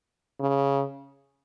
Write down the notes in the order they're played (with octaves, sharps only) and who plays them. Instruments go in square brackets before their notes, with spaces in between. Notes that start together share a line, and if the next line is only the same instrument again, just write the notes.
[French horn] C#3